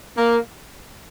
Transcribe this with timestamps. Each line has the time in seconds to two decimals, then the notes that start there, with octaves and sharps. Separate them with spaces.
0.17 A#3